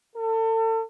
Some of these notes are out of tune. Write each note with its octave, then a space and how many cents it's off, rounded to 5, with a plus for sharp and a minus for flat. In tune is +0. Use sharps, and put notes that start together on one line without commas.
A4 +35